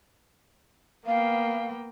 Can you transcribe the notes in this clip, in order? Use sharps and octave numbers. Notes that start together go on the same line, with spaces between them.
A#3 B3 F5 G5